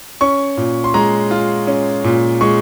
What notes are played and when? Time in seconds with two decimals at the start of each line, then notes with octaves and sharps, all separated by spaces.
0.21 C#4 C#6
0.57 A#2
0.84 C6
0.94 G#3 A#5
1.31 F4
1.67 C#4
2.04 A#2
2.41 G#3 C#6